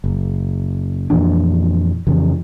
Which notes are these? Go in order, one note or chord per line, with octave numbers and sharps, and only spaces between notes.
F#1
F2 A#2 E3 D4
F2 C#3 E3